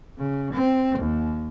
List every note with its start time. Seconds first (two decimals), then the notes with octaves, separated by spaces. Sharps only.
0.18 C#3
0.54 C4
0.99 D#2